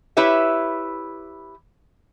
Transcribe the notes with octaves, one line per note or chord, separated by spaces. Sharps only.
E4 G4 B4 C#5 E5